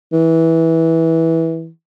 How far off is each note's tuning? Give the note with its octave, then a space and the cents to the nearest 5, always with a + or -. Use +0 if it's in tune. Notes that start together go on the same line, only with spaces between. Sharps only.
E3 -15